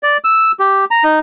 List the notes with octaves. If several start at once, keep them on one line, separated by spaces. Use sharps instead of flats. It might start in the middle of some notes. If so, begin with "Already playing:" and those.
D5
E6
G4
A#5
D#4